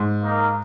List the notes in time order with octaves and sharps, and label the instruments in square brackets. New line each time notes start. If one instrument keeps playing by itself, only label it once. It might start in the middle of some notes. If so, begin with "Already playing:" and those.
Already playing: [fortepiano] G#2
[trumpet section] A#3 D#4 A#4 F5